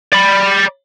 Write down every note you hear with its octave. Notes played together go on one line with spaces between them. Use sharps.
D5 B5